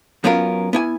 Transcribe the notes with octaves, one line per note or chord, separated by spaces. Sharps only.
F#2 B3 C#4 F4 A#4
B3 E4 G#5